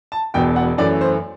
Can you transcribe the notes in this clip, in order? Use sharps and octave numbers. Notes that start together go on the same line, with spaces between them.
A5
E1 E2 B2 G5
F#5
F#2 E3 A3 D5
C5